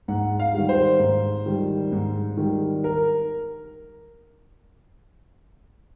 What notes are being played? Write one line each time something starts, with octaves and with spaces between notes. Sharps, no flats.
G#2 F#5
F5
D#3 G3
C5
G#2
D#3 G3
G#2
D#3 G3
A#4